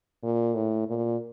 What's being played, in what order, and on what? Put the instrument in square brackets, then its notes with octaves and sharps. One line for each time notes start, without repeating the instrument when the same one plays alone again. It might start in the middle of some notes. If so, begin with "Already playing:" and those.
[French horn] A#2
A2
A#2